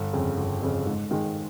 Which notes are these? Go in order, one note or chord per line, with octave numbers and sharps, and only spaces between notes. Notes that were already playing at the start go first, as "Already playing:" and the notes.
Already playing: G1
F2 C#3
G1
F2 C#3
G#2
D#3 G#3